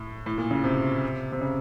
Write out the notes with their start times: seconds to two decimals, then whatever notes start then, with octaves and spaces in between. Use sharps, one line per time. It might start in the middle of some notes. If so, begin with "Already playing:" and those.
Already playing: A2
0.26 A2
0.38 A#2
0.51 C#3
0.64 C3
1.32 C3
1.41 C#3